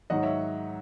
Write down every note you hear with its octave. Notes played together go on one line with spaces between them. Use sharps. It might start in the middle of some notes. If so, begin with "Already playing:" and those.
G#2 D#3 F#3 D#5 F#5
C#5 E5